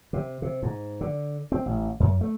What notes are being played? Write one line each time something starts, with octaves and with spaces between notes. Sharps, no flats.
C3
C3
G#2
D3
C4
A1
F#2
A3